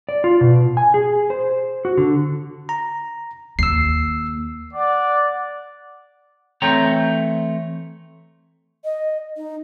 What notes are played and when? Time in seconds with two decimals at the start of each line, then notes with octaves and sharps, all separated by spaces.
0.09 D5
0.24 F4
0.41 B2
0.77 G#5
0.94 G#4
1.30 C5
1.85 F#4
1.98 D3
2.69 A#5
3.59 D#2 E6 C7
4.73 D5 F#5
6.62 E3 A3 C4 C#5 G5 A#5
8.84 D#5
9.36 D#4